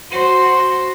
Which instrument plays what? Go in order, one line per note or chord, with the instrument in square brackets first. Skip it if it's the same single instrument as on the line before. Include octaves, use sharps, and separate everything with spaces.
[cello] F#4 C5